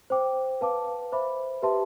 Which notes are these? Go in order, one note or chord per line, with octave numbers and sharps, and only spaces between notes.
C5 G5 D6
B4 F5 A5 D6
C5 E5 B5 D6
G4 B4 E5 A5 C6